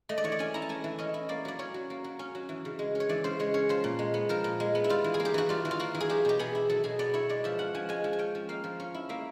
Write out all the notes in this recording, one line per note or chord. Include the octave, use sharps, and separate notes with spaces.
A3 D#5
D5
E3 C#5
D5
C#4 G#5
E4 A#5
A5
A3 G#5
E3
C#4 D#5
E4
A#3 D5
F#3 D5
C#4 C#5
F#3
A#3
F#3
C#4
F#3
E3
C#3
G#3
C#4
C#5
E3 D5
C#3 C5
G#3 C#5
C#4 C#5
F3 C5
A#2
G#3
B3
F3 A#4
A#2
G#3
B3
E4
G3 F4
E3
G#4
A#3
G4
E3 F#4
G3 F4
E3
F4
A#3 F#4
E3
G#4
F#3 G4
B2 G4
B3 G#4
E4
F#3 A4
B2 G#4
B3 D5
E4 C#5
G#3 D5
F3 E5
C#4 F#5
F3 G#5
G#3 G#5
F3
G#5
C#4 G5
F3
A#3 F5
F3
C#4
E4
A#3 E5